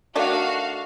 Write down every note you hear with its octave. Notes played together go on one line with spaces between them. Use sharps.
D#3 A3 D4 F#4 F5